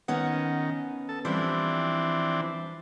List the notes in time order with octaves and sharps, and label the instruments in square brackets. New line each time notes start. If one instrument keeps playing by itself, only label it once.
[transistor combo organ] D#3 [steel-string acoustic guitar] B3 C#4 F#5
[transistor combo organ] A4
[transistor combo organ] E3 C4 D4 [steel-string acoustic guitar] F3 G3 E4